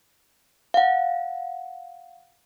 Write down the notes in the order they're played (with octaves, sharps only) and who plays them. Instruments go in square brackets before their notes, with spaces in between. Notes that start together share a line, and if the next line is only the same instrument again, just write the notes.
[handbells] F5 F#5